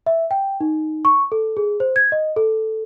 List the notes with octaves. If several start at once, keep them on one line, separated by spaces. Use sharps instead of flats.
E5
G5
D#4
C#6
A4
G#4
C5
G#6
D#5
A4